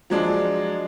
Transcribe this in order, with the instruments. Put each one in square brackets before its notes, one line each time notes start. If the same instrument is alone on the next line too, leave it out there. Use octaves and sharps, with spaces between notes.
[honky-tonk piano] F3 F#3 G#3 D4